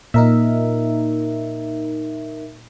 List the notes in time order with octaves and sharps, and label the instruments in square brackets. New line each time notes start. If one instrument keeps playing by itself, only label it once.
[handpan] A#2 [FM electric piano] D#4 A#4 E5